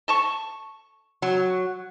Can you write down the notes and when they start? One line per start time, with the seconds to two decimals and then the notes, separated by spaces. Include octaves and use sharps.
0.08 A4 A5 C#6
1.22 F#3